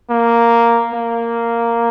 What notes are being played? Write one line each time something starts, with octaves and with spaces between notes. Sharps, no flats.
A#3
A#3